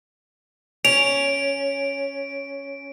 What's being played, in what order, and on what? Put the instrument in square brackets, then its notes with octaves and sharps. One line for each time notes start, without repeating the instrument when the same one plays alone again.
[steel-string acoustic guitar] C#4 [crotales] D7 [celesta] F7